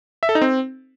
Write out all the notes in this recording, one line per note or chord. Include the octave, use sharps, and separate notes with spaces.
E5
A4
D#4
C4